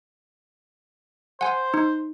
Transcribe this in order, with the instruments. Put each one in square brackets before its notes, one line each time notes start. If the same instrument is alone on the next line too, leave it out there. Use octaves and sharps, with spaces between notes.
[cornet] C5 [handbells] F#5 G#5
[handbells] D#4